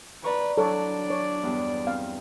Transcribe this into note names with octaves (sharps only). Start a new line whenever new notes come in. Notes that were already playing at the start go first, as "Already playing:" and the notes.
B4 D5 A#5 C#6
F#3 D4 E4 A4 C#5 D5
C#5
E2 G2
C4 F5